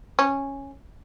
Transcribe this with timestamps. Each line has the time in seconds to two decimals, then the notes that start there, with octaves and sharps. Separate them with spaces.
0.19 C#4